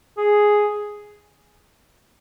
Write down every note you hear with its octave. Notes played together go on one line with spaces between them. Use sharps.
G#4